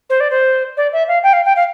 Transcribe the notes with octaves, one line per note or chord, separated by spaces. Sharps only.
C5
D5
C5
D5
E5
F5
G5
F5
G5
F5